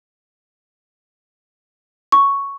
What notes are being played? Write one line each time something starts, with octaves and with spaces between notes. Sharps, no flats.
C#6